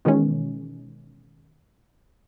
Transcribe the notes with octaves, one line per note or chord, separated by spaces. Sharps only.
B2 D#3 E3 G#3 C#4